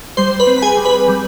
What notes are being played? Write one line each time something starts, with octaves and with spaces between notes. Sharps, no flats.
G3 C5 C6
B4 B5
C4
B5
G#4 G#5
G3
B4 B5
G3